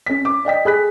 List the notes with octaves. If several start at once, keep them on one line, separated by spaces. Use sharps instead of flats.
C#4 B6
D6
D5 D#5 G5 B6
G#4 B5 F#6 B6